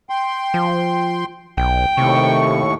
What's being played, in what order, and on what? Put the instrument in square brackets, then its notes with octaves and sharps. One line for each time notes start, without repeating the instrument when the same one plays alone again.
[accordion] G5 C6
[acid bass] F3
[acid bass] B1 [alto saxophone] G5
[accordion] D#2 A2 C#6 [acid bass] C3